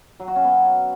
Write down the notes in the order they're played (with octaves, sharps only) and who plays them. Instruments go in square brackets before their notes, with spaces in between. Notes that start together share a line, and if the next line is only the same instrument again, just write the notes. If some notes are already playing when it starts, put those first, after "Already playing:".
[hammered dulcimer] F#3
F#4
C#4
B3